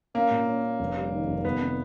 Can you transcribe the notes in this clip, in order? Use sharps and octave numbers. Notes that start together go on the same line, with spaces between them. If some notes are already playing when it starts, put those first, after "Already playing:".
A#3 C#4
A#2
C#4
C#4
F1
G3
D#3
F1
F1 B3
C3